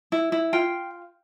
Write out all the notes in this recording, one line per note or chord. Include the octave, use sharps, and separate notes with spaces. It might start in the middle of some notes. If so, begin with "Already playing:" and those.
E4
E4
F4 G5